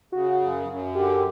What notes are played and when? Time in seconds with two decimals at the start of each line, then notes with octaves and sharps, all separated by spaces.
0.12 C#3 F#4
0.41 F#2
0.68 F#2
0.95 D3 G4